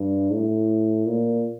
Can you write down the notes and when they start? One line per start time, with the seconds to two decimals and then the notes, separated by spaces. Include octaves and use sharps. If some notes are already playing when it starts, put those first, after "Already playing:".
Already playing: G2
0.31 A2
1.06 A#2